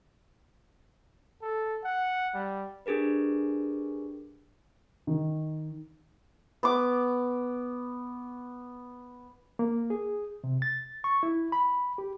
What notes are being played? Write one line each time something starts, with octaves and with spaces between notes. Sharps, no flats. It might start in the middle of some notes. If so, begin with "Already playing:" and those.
A4
F#5
G3
D4 G4 G#4 A#4 B4
D#3
B3 D6
A#3
G#4
C3
A6
C#6
E4
B5
G4